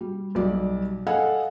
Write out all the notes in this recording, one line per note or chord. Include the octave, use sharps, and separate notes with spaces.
G3
B1 G3 D5
A4 D#5 F5 F#5 G#5